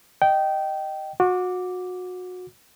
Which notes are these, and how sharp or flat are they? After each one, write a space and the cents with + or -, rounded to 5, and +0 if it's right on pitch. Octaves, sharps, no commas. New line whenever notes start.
D#5 -10 G5 -15
F#4 -25 D6 +0